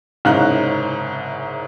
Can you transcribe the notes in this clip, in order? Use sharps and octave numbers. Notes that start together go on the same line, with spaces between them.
F#1 C2 G#2 C#4 D#4 F#6